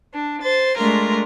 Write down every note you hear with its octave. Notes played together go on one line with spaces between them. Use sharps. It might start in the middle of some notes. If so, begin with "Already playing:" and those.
D4
C5 A6
G#3 A3 D4 F4 A#4